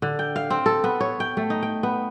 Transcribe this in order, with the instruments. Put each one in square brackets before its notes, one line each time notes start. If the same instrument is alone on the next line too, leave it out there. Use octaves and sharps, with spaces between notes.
[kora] D3
G5
F5
C4
A4
B3
C#5
G5
A3
D#4
G5
B3